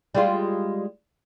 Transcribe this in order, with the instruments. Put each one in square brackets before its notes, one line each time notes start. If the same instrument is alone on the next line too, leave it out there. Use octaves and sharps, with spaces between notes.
[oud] G3 G#3 F4